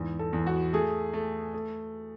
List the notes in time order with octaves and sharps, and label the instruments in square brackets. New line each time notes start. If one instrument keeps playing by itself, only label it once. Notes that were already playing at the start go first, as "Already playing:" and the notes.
Already playing: [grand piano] E2 G#2
A4
E2
F#4
A3 G#4
A3
A3